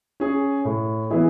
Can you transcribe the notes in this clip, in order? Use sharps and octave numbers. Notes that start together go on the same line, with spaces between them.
C#4 G#4
A2
E3 B3 E4 G#4